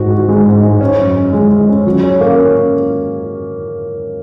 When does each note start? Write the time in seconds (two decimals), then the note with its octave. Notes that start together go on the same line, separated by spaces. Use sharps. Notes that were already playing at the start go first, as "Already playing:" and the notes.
Already playing: G#2 F#4
0.10 F#4
0.28 G#3
0.46 G#2
0.63 G#2
0.81 C#4
0.99 F#2
1.16 C#4
1.33 G#3
1.51 G#3
1.69 C#4
1.87 F#3
2.04 C#4
2.21 A#3
2.38 C#4